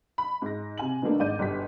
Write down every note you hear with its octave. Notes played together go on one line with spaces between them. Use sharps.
B5
G#2 A#6
C3 G#5 F#7
B2 D3 E3 A3 A#3 D4
G#1 G#2 D5 D#5 G6 D#7
G1 B2 G4 B6